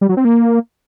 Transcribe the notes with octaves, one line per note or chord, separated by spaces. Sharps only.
G3
F#3
C4
A#3